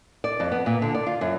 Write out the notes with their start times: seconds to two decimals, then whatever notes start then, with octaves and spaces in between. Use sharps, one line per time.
0.24 D5
0.40 F2
0.52 B3
0.66 A#2
0.82 D3
0.95 D5
1.07 F4
1.21 F#2